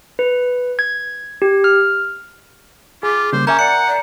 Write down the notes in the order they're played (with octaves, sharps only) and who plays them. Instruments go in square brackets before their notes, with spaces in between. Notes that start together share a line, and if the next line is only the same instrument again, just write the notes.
[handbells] B4
G#6
G4
F6
[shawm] F4 [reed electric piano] G#4 [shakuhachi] D6
[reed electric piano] C#3 G3 A#3 [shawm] C5
[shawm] C#4 [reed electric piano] A#4 E5 G#5 [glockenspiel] A#5 G6
[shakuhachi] D5 [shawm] F#5 [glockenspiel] C#7
[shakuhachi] D5